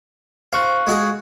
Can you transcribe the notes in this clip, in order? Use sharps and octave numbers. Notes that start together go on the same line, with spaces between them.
C5 F5 C#6 F#6
G#3 F#4 G#4